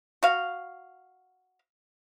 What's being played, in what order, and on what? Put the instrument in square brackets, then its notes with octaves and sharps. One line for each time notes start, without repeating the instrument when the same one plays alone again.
[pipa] F#4 F5